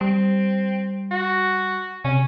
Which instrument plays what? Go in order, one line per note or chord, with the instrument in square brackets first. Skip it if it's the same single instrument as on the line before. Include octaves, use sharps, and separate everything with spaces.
[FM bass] G3 [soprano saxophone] C4
[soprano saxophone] F#4
[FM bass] C3 [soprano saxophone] C#4